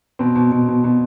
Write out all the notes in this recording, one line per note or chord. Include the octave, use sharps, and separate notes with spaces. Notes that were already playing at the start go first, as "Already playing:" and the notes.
B2 C4
B2
B2
B2
B2